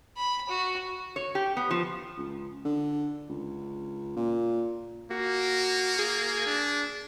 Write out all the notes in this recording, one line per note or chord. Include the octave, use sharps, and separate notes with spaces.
B5
F#4
C#5
G4
B3
F3
C#2
D3
C#2
A#2
A#3 F#4
G#4
D4